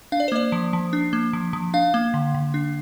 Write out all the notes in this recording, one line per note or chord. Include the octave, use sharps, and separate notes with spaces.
D4 F5
D5
C5
A#3 D5
F3
F3
D4
A#3
F3
F3
D4 F5
A#3
D3
D3
D4